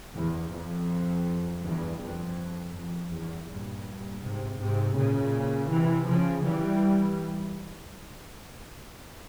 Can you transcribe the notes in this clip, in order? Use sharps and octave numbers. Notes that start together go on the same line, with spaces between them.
E2
F2
E2 G2
F2
F2
E2 G2
G2 A#2
G#2 C3
G#2 C3
A#2 C#3
C3 E3
C#3 F3
E3 G3